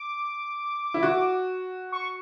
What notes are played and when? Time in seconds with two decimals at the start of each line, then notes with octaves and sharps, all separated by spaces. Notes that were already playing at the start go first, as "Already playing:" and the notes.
Already playing: D6
0.94 E4
1.03 F#4
1.92 C#6